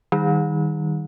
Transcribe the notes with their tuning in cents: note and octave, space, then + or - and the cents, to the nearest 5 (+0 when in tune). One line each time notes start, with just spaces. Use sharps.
D#3 +0 G3 +0 D#4 +15